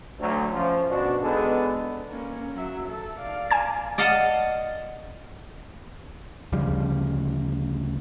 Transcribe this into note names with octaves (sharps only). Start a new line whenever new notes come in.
D2 F#3
F3 C#4
B2 D4 F#4
G#3 B3 D4 D#4 G#4 A4
A#3 C#4
F#3 E5
A4
D5 F5
G#5 A5 G#6
D5 D#5 F5 F#5 A5
D2 C#3 F3 G3